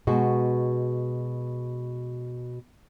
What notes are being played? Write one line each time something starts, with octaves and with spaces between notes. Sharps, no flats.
B2 G#3 F#4